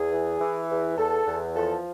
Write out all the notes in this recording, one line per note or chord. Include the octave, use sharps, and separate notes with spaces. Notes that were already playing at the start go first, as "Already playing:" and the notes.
Already playing: E2 G#4
E3
E3
E2
E2 A4
E2
F3 A4